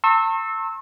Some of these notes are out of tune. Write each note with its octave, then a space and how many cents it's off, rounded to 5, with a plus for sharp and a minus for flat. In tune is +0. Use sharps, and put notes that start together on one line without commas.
A5 +40 C#6 -45 E6 -15